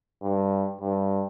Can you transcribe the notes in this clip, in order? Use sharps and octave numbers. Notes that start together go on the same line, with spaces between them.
G2
G2